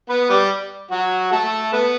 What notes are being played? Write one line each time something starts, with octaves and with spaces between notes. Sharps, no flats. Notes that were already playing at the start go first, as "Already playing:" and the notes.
B3 B4
G3 G4
F#3 F#4
A3 A4
B3 B4